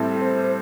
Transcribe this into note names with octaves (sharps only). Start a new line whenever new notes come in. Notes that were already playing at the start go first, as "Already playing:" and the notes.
Already playing: A2 G3 C4 E4 A4
C5
C5